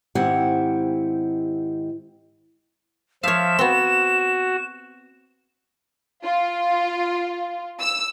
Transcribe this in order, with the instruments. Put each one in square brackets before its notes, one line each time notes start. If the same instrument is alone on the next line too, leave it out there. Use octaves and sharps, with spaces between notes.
[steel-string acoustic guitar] G#2 D#3 C4 E4 G4 F#5
[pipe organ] F3 E5 [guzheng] C#5 F5 [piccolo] E7
[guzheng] B3 C4 [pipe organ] F#4
[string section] F4
E6